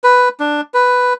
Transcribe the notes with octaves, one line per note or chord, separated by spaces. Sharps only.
B4
D4
B4